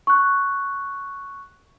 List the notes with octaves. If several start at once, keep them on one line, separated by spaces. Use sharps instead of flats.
C#6 F#6